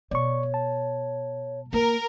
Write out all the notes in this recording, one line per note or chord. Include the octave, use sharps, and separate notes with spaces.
B2 C#5 D5 C#6
A5
A#3 A#4